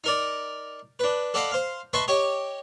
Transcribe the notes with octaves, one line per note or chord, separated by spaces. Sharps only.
D#4 A#4 D5
D4 B4
A4 D5 D#5 F5 F#5 B5
C5 F5
B4 D#5 E5 A5 C6 C#6
G4 C#5 D#5